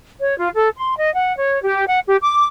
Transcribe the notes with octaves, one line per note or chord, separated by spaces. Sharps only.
C#5
F4
A4
C6
D#5
F#5
C#5
G4
F#5
G4
D6